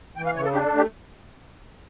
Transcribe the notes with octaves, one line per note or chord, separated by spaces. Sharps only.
E3 G5
F5
C#3 C#5
A4
D4 G4
A4
A3
G4